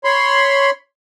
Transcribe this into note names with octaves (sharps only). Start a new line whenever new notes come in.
C#5 B5 C6